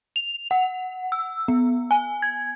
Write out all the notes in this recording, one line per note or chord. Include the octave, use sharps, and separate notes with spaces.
F7
F#5
E6
B3
G#5
G#6